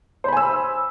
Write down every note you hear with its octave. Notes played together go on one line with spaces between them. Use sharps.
C5 G#5 B5 E6